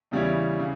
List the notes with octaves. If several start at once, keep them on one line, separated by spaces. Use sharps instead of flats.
E2 C#3 G3 C#4 E4
C#3